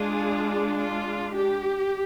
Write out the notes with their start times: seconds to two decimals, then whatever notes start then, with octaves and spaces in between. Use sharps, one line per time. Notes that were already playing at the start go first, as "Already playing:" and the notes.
Already playing: G#3 D4 F4 G#4
0.81 F4
1.35 G4